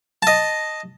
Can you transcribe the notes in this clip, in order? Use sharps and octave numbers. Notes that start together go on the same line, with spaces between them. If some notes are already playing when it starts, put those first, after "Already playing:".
D#5 A5